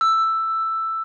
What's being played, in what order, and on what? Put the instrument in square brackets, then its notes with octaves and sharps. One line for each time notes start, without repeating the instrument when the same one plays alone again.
[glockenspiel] E6